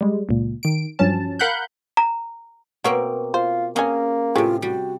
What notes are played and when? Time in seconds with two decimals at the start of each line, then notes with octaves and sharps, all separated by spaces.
0.01 G3 G#3
0.29 C#2 A#2
0.63 D#3 D7
0.99 G2 F3 F#3 C#4 A5
1.39 A#4 F5 F#5 B5 F#6 G6
1.97 A#5
2.84 B2 A#3 C4 F#4 C#5
3.34 F4 C5
3.76 A#3 C4 C#4 F#4 G#4 G#5
4.35 A2 C3 F4 G4 G#4 C#5
4.62 G3 F#4